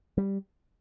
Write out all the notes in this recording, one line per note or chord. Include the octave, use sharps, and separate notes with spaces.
G3